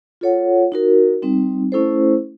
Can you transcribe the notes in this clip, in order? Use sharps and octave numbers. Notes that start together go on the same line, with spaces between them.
F4 A4 C#5 F#5
D#4 F#4 A#4
G3 C4 D#4
A3 C#4 E4 A4 C5